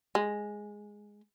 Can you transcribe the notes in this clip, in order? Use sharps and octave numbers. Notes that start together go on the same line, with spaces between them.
G#3